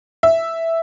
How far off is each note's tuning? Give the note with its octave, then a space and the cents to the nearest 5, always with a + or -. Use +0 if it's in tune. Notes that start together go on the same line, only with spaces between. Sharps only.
E5 +0